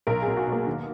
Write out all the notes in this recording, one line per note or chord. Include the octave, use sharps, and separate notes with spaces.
B1 A#4
G#4
B2
F#4
B2
A#3
D#2